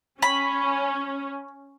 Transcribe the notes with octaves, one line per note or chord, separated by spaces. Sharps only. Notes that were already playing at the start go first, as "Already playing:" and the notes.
C#4 B5